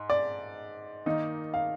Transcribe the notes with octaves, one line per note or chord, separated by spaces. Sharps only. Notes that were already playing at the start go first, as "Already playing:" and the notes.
Already playing: G#2
D5
D#3 A#3 D#4
F5